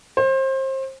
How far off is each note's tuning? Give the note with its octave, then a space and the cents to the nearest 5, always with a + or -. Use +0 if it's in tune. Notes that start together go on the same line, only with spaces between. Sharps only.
C5 +30